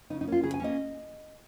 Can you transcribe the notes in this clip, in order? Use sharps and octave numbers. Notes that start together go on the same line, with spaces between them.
C#3 D#4
D#4
A#3 C#4 F4
C#3 G#4
G#5
A#3 C#4 D#5